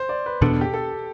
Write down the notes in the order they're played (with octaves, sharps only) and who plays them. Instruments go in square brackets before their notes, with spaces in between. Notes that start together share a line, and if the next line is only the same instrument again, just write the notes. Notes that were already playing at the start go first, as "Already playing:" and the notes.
Already playing: [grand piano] C5
D5
B4
[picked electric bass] E2 B2 B3 D4 [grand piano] A4
[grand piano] G4
A4